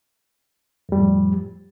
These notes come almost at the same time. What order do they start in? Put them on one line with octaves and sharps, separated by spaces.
F2 G3 F3 A2